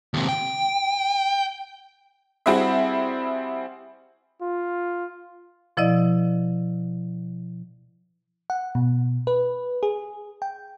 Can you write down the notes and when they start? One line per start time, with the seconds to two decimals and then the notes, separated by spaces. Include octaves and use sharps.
0.14 D#2 C3
0.29 G5
2.46 G3 C4 E4 F#4 G#4 E5
4.41 F4
5.77 B2 F3 E4 D5 D#5
8.50 F#5
8.75 B2
9.27 B4
9.83 G#4
10.42 G5